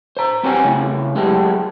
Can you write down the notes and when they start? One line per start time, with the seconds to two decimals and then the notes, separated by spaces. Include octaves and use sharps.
0.17 C5 A#5
0.43 C4 C#4 F#4 G4 B4 G#5
0.64 C#3 A3 E4
1.16 F#3 G#3 A3 B3 G4 G#4